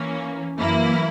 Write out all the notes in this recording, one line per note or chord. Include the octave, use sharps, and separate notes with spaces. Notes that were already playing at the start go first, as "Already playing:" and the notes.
Already playing: E3 A#3 C#4
F#2 E3 A#3 E4